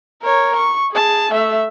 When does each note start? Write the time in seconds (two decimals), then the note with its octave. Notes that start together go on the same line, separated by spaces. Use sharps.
0.23 A#4 C#5
0.56 C#6
0.92 G#4 A5
1.31 A3 E5